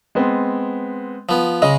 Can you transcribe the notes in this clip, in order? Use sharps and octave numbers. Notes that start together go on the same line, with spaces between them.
G#3 B3 C4
F3 B3
C#3 G#3 D#5